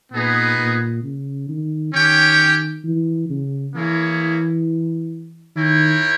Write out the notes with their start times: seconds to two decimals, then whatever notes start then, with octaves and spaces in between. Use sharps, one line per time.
0.12 A#2 B3 D#4 G#4 B4
0.58 A#2
1.03 C#3
1.49 D#3
1.93 D#3 C#4 G4 C#5 G5
2.84 E3
3.30 C#3
3.75 E3 A#3 E4 G#4 C#5
5.56 D#3 E4 A#4 C#5 G5